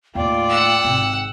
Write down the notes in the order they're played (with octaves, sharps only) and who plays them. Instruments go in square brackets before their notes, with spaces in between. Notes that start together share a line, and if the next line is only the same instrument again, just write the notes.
[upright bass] D#2 A2 [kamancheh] F4 D5 [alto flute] G5
[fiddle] F#5 E6
[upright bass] G#1 C3